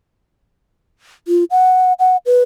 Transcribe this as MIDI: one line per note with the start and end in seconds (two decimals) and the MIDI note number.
1.28 1.44 65
1.51 1.93 78
1.99 2.17 78
2.26 2.43 71